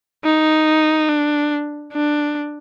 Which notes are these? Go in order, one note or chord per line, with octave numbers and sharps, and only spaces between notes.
D#4
D4
D4